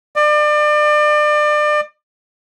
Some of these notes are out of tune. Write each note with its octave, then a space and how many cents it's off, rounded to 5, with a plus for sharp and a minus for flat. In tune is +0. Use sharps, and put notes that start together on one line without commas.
D5 +30